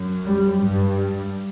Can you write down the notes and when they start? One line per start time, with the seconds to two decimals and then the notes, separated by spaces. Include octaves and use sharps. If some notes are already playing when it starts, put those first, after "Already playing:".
Already playing: F#2
0.25 G3
0.60 G2 G3